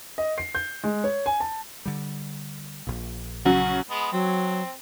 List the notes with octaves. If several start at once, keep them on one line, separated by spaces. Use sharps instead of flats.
D#5
C7
G6
G#3
C#5
G#5
A5
D3 G3
A#1 A#2
C#3 F#3 C#4 F#4
G#3 B3
F#3 C4